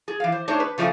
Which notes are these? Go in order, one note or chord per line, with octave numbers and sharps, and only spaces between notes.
G#4
E3 F5
C5
A3 D4 D#4 G#4 C5 C#5
B4
C#3 F3 A3 D5 E5 G#5